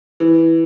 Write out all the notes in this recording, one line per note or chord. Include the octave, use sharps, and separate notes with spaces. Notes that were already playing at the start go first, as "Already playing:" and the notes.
E3